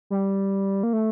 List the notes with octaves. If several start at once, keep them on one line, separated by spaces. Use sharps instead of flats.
G3
A#3
A3